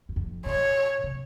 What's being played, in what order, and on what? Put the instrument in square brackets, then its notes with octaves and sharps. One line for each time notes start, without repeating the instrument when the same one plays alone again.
[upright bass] F#2
F2
[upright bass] B2 [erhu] C#5
[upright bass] C3